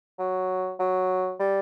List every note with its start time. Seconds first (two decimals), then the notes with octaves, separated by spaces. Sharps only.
0.19 F#3
0.79 F#3
1.39 G3